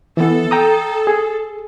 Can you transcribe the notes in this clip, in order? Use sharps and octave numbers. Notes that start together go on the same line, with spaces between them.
E3 B3 A4
G5 A#5 D#6
G#4